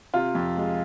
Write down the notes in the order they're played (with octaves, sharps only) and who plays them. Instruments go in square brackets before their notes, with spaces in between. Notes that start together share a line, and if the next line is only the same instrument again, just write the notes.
[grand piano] C3 F4
F2
G#3